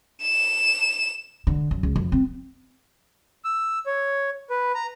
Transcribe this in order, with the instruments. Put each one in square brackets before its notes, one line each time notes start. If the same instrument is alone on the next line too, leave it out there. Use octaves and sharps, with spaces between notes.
[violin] E7
[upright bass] D3
F#2
C#2
F2
C4
[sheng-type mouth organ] E6
C#5
B4
A#5